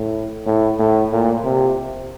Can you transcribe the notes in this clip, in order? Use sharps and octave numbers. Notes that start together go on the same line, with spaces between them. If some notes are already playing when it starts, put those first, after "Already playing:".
Already playing: A2
A2
A2
A#2
C3